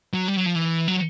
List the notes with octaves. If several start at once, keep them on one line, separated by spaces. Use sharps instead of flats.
F#3
G3
F#3
F3
E3
F#3